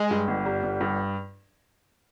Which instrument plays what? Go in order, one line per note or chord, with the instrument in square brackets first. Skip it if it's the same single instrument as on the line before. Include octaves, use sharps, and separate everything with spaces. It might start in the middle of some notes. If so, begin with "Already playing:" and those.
Already playing: [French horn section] G#3
[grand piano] G2
G1
G3
G1
G2